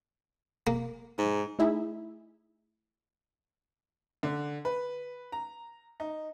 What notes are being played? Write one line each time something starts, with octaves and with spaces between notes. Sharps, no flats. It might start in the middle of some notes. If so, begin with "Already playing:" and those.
A#3
G#2
A3 D#4 E4 G#4 E5
D3
B4
A#5
D#4